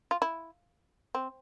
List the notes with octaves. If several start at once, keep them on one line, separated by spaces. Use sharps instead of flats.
F4
E4
C4